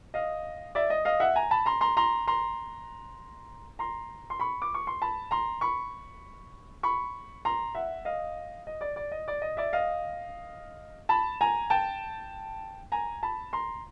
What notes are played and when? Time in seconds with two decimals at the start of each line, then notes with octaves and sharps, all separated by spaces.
0.14 D#5 F5
0.75 D5 E5
0.90 D#5
1.05 D#5 F5
1.20 E5 F#5
1.36 G#5 A#5
1.51 A5 B5
1.66 A#5 C6
1.81 A#5 C6
1.97 A#5 C6
2.28 A#5 C6
3.79 A#5 C6
4.30 C6
4.40 B5 C#6
4.62 D6
4.74 C#6
4.87 C6
5.02 A5 B5
5.31 A#5 C6
5.61 B5 C#6
6.83 B5 C#6
7.45 A#5 C6
7.75 E5 F#5
8.05 D#5 F5
8.67 D#5
8.81 D5
8.96 D5
9.12 D#5
9.28 D5
9.42 D#5
9.57 D5 E5
9.73 D#5 F5
11.09 A5 B5
11.41 G#5 A#5
11.70 G5 A5
12.92 G#5 A#5
13.23 A5 B5
13.53 A#5 C6